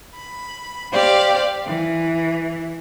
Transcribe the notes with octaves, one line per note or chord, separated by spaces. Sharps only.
B5
G4 C5 D5 F5
E3